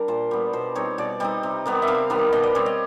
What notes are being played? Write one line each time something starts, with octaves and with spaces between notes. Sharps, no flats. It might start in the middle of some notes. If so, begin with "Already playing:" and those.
Already playing: G3 D4 A#4
A#2 C5
G3 B3
B2 C5
G3 C4 D#4 C#5
B2 D5
G3 C4 D#4 D#5
C3
D#3 G3 B3
E5
C3 F5
D#3 G3 B3
B2 D#5
D5
G3 C4 C#5
D#5